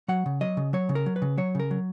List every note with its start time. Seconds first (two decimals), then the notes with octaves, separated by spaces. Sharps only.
0.08 F#3 F#5
0.26 C#3
0.41 F#3 D#5
0.57 C#3
0.73 F#3 C#5
0.89 C#3
0.95 A#4
1.06 F#3
1.16 B4
1.22 C#3
1.38 F#3 C#5
1.55 C#3 A#4
1.71 F#3